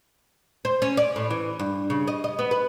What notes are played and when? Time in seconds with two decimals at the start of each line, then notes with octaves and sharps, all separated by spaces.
0.65 C5
0.82 C#4
0.97 D5
1.16 A2
1.31 E3
1.59 G2
1.90 C#3
2.08 D#5
2.24 D#5
2.39 B3
2.51 B4